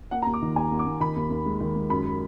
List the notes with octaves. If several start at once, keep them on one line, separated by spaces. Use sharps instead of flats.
A#3 F#5
A#5
D#2
D6
D#3
D#2 G#5
D#2
D6
D#2
D#3 B5
D#2
D#2
G#3
D#3
G#3
F#2 B5